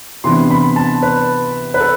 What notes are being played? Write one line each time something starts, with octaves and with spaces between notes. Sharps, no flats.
C3 E3 B3 D4 C6
B5
A5
B4
B4
A4